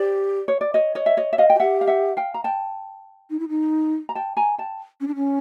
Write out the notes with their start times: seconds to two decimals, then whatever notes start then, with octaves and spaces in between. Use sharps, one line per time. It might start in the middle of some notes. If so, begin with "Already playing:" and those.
Already playing: G4 C5 D5
0.48 C#5
0.61 D5
0.74 C#5 D#5
0.95 C#5 D#5
1.06 E5
1.17 C#5 D#5
1.33 E5
1.38 D#5 F5
1.50 G5
1.56 F#4
1.60 G4 E5 F#5
1.81 F5
1.87 E5 F#5
2.17 F5 G5
2.34 A#5
2.44 G5 A5
3.30 D#4
3.39 E4
3.49 D#4
4.09 A#5
4.15 G5 A5
4.37 G#5 A#5
4.58 G5 A5
5.01 C#4
5.08 D4
5.15 C#4